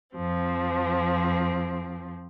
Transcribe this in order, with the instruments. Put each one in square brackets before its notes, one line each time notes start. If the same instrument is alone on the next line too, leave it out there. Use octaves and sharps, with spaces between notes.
[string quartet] F2 F3 C4